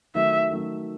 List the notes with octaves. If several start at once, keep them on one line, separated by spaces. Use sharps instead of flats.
D#3 F#3 A3 E5
D#3 F#3 A3